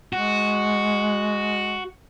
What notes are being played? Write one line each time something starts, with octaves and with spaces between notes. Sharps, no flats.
G#3 F#4